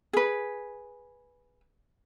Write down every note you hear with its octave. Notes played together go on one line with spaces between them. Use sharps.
G#4 B4